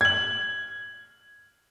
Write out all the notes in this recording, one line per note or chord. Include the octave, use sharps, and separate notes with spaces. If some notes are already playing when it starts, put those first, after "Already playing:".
G#6 F#7